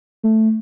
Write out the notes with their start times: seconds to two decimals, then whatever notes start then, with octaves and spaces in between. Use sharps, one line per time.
0.24 A3